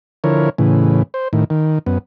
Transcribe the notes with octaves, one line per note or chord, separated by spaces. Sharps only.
D3 F3 E4 A#4 C#5
A2 C#3 E3
C5
A2 D#3
D#3
F#2 B3